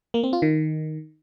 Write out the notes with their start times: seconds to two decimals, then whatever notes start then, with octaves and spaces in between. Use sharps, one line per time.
0.14 A#3
0.23 C4
0.33 F4
0.42 D#3